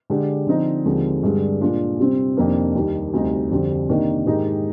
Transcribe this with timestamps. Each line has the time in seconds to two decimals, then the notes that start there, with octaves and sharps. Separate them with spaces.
0.10 D3 G#3 D4 G4
0.47 D3 F3 C4 D#4
0.85 D#2 D3 F3 G#3 C4
1.23 G2 D3 G#3 D4
1.61 A#2 G#3 D4 F4
1.99 C3 G3 C4
2.37 F2 C3 D#3 A#3 D4
2.75 D#2 D#3 G3
3.13 D2 C3 G3 C4 D#4
3.51 F2 D3 G3 C4
3.89 C3 D#3 A#3 D4
4.26 G#2 D#3 G#3 D#4 G4